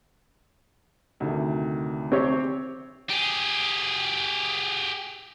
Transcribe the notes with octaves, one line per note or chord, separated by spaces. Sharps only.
D2 C3 D#3
C4 G4 C#5
G4 G#4